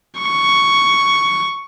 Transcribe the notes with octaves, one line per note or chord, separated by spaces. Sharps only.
C#6